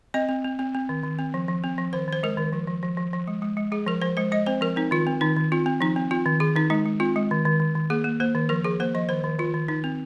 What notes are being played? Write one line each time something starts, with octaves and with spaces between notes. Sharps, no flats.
C4 D#5
C4
C4
C4
C4
D#3
D#3
C4
F3
F3
C4
F3
D#3 C5
D#3 C5
G#3 A#4
D#3
F3
F3
F3
F3
F3
G#3
G#3
G#3
G#3 G#4
F3 A#4
F3 C5
G#3 C5
G#3 D#5
C4 C5
F3 A#4
C4 D#4
D#3 F4
C4
D#3 D#4
D#3
C4 F4
C4
F3 D#4
C4
C4 F4
D#3
D#3 G#4
D#3 D#4
G#3 D#4
G#3
C4 F4
G#3
D#3
D#3
D#3
D#3
A#3 G#4
A#3
A#3 C5
D#3
F3 A#4
F3 G#4
A#3 C5
F3 D#5
D#3 C5
D#3
D#3 F4
D#3
D#3 D#4
C4